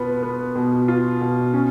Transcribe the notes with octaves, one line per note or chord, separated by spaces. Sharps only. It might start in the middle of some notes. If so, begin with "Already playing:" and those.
Already playing: B2 B3 F4
B3
B2
F4
B2
C#4